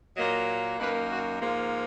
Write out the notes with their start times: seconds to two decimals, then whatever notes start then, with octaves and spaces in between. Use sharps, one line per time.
0.16 A#2 F#3 A#3 D#5
0.79 F#2 D#3 A#3 B4
1.10 F#4
1.40 G#2 F3 A#3 F4